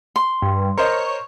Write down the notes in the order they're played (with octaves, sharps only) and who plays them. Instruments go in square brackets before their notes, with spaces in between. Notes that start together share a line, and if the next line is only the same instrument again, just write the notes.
[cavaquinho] C6
[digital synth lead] G2
[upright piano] A#4 C5 D#5 [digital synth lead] C#5